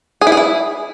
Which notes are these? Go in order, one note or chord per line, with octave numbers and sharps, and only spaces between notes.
G#4
E4
G#4
E4